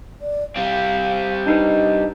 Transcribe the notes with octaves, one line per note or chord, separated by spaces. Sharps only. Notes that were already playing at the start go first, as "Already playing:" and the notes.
D5
G3 C4 F5
D4 D#4 B4 D#5